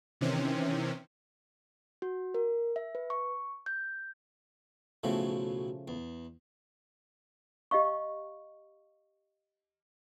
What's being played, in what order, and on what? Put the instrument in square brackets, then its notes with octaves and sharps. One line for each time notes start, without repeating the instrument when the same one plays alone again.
[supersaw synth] C3 D#3 E3 C4 C#4
[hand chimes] F#4
A#4
E5
B4
C#6
G6
[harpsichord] B1 A2 F#3 [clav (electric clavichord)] C#3 F3 A3
[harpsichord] E2
[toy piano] G4 D#5 F5 C#6